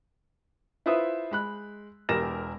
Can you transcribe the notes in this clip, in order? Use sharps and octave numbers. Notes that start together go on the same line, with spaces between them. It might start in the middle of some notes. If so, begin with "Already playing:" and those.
E4 F4 B4 C5 E5 D#6
G#3 B5 F#6
E1 E2 G4 A#4 A#6 E7